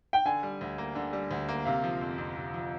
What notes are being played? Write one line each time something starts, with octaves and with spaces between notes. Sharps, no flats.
G5
D3 G#5
G3
D2
A#3
D3
G3
D2
A#3
C3 F5
F3
F2
F2
C3
F3